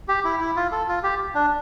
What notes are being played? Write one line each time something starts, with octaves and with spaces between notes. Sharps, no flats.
G4
E4
E4
F4
A4
F4
G4
D4